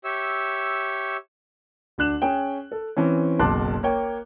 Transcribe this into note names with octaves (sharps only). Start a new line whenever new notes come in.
G4 C#5 E5 E6
D2 D4 F#6 E7
C#4 G#4 G5
A4
E3 C4 C#4
F#1 B1 A5 C6 D6 F#6
A#3 C#5 G5